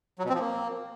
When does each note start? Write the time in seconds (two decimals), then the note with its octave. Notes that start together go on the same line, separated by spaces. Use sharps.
0.19 F#3
0.24 B2
0.29 C4
0.34 F3
0.39 A#3